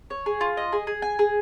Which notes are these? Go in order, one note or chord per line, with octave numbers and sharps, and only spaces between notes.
C#5
G#4
F4
D#5
G#4
G#4
G#5
G#4